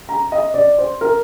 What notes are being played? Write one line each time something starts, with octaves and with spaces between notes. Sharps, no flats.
A#5
D#5
D5
C5
A#4